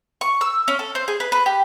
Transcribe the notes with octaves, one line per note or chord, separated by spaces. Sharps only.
C#6
E6
C#4
A4
C5
G#4
B4
B4
G4